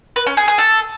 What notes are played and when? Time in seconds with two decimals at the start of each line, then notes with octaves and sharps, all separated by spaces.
0.16 B4
0.27 C#4
0.37 G#4
0.48 G#4
0.58 A4